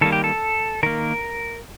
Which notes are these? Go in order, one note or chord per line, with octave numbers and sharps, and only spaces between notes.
D#3 G3 A#3 A4
G4
A4
D#3 A#3 A#4